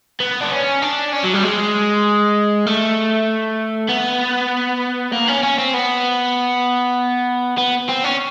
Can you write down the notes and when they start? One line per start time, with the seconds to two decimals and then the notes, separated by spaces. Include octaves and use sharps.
0.20 B3
0.41 D4
0.51 C#4
0.82 D4
1.13 C#4
1.25 F#3
1.34 G3
1.44 G#3
2.66 A3
3.89 B3
5.12 A#3
5.28 C#4
5.43 C#4
5.58 C4
5.74 B3
7.58 B3
7.89 C4
8.04 C#4